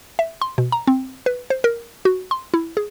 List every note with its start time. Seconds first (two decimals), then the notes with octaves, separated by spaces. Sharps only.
0.19 E5
0.42 C6
0.58 B2
0.72 A#5
0.87 C4
1.26 B4
1.50 C5
1.64 A#4
2.05 F#4
2.31 C6
2.54 E4
2.77 G#4